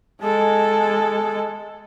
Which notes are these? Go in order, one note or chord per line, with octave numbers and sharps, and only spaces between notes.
G#3 A4